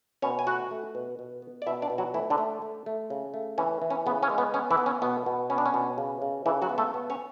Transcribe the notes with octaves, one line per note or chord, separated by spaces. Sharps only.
B2 C#4 C#5
G#5
A3 F#4 F#5
A3
B2
B2
B3
D5
B2 E4 E5
D4 D5
B2
F#3 F#4
E3 A3 E4
D3 D4
A3
A3
A3
C#3
A3
E3 C#4
E3
C#4
C#3 B3
C#4
G#3
B3
B3 C#4
E3 E4
B3
C#4
B2 B3
B2
B3 C#4
D4
C#4
B2
C#3
C#3
C#3 E3 E4
F#3 F#4
B3
A3 A4
B3
C#4 C#5